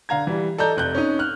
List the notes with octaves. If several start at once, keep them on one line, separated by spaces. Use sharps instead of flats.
D3 F5 A#5 G#6
E3 G3
A4 D5 D#5 A#5 G6
F1 F#6 G6
C#4 D#4
F6 F#6